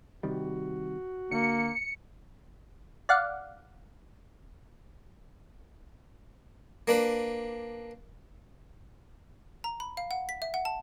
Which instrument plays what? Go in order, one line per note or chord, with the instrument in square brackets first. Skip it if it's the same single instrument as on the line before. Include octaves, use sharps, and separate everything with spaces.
[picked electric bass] C3 D#3 G3 [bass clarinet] F#4
[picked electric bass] D3 [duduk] A#3 [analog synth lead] C#7
[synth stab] D5 F5 F#5
[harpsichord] A#3 D4 B4
[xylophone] A#5
B5
F5
F#5
B6
E5
F#5
A5